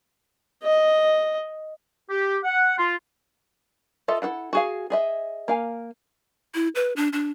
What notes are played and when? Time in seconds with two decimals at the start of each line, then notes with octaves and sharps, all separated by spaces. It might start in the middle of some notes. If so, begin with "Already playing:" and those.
0.63 D#5
2.10 G4
2.44 F#5
2.78 F4
4.08 F4 A4 D#5 E5
4.22 E4 G#4 A4 F#5
4.53 F#4 G#4 F5
4.90 G#4 D#5 E5
5.48 A#3 F5 G#5
6.55 E4
6.75 B4
6.96 D4
7.13 D4